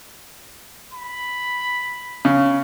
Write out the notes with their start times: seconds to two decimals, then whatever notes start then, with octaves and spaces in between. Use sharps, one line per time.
0.93 B5
2.25 C#3